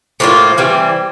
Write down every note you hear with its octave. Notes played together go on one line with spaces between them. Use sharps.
A2 F3 A#3 F4
E3 G3 C4